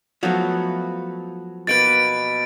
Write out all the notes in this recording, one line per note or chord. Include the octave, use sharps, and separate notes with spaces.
F3 F#3 A3 B3 F#4
B2 A#3 B4 A6 D7